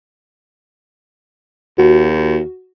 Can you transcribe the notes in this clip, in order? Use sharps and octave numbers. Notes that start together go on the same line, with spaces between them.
D#2 F#4